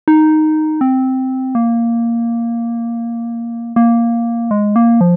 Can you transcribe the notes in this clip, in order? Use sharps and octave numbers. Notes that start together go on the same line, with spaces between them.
D#4
C4
A#3
A#3
G#3
A#3
F3